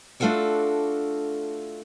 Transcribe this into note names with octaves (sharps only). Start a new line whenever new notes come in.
A3 D4 F4 F#4 A4 D5